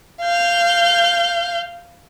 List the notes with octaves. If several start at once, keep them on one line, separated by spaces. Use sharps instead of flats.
F5 G6